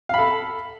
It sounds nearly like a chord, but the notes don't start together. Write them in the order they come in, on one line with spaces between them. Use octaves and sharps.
F5 B5 A4